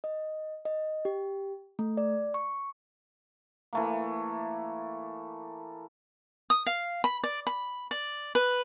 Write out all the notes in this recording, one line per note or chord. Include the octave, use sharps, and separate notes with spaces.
D#5
D#5
G4
A3
D5
C#6
E3 A3 A#3
D#6
F5
B5
D5
B5
D5
B4